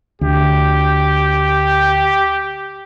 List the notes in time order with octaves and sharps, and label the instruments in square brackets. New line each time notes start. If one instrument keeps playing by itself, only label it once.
[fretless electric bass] D2 [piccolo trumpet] G4